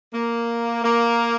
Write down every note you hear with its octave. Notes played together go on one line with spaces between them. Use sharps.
A#3
A#3